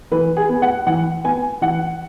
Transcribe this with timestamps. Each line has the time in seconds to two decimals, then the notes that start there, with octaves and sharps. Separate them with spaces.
0.12 E3 B4
0.37 G#4
0.49 B3
0.62 F#5
0.87 E3 F#5
1.24 B3 G#5
1.61 E3 F#5